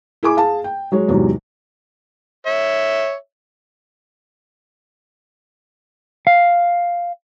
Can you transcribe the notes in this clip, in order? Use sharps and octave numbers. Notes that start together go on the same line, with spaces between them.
E4 G#4 G#5 D6
G#4 F5 A5
G5
F#3 G#3 C#5
E2 G#2 C3 F#3
C#5 E5
F5